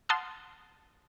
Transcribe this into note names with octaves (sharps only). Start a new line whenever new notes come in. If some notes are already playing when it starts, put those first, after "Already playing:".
F#5 A5 C6 D#6 F6